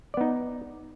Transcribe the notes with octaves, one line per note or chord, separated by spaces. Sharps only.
B3 D#4 D5